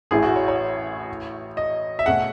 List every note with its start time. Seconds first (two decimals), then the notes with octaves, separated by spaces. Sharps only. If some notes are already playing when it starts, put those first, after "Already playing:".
0.11 A1 A2 E3 G#4
0.23 F#4
0.36 C#5
0.48 C#5
1.57 D#5
1.99 E5
2.06 B2 A3 C#4 G#4 F#5